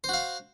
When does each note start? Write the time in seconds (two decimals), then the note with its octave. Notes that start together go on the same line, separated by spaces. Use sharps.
0.04 C5
0.09 F#4
0.13 F5